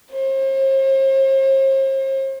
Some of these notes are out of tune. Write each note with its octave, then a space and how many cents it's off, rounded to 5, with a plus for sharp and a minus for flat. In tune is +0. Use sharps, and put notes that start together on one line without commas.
C5 +45